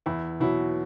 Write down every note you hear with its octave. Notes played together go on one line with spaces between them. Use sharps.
E2 E4
B2 F#3 E4